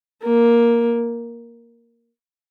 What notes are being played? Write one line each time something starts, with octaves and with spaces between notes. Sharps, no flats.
A#3